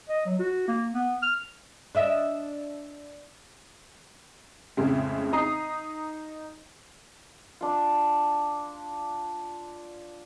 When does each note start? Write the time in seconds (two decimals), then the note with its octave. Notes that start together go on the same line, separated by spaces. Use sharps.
0.09 D#5
0.25 F#3
0.39 F#4
0.68 A#3
0.93 B3
1.22 F6
1.95 D4 D#5 E5
4.77 F2 A2 C#3 G#3
5.33 D#4 A#5 D#6 C7
7.61 D4 F4